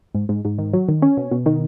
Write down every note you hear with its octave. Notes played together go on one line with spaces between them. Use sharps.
G#2
G#2
G#2
D#3
F#3
D#3
C#4
B2
B2
D#3